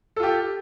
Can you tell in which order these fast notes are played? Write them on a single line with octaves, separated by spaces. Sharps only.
A4 F4 G4